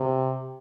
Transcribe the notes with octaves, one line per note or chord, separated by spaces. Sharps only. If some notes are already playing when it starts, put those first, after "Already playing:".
Already playing: C3